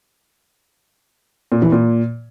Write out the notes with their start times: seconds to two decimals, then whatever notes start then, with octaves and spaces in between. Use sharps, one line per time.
1.52 A#2
1.62 E3
1.72 A#2